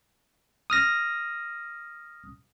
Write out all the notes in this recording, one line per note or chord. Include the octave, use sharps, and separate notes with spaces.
D#6 F6 A#6